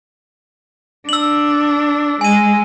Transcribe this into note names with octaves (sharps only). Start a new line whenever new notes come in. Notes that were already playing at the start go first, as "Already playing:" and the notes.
D4 E6 F#7
G#3 G#5 D#7